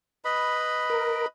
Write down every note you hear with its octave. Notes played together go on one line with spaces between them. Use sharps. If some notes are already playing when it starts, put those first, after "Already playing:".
B4 D#5 B5
A#4